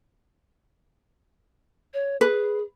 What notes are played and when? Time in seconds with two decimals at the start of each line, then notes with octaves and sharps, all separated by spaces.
1.94 C#5
2.21 G#4 B4